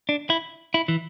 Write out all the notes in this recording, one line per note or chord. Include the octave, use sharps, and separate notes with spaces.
D4
E4
E4
E3